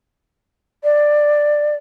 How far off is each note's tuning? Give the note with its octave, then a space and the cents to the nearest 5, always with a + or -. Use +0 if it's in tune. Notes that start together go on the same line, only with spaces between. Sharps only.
D5 +10